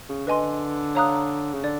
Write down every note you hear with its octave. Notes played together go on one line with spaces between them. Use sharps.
C#3
D3 B4 D#5 G#5 C6
C#5 F5 A#5 D#6 F#6
C#3
D3 D5